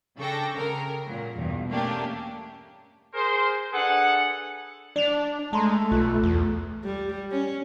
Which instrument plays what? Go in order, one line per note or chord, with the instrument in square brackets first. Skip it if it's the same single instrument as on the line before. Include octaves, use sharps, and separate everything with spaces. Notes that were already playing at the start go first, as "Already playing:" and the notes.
[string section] C#3 D4 A4 G5 C#6 A#6
C#3 A#4
A#2 F#3
E2 G2 B2
A3 A#3 C#4 D4 G4
[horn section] G#4 A#4 C5
D4 G#4 A4 B4 F#5
[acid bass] D4 [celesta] D5 F7
[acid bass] G#3 [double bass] A3 [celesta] A5 A#5 C6
[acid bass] B1 [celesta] F4 F#6
[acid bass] E2
[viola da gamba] G3
C#4